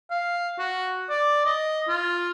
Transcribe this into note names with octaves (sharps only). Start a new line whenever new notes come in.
F5
F#4
D5
D#5
F4